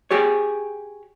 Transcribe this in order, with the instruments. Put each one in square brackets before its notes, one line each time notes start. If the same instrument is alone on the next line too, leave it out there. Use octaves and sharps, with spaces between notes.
[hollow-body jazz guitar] G4 G#4 C#5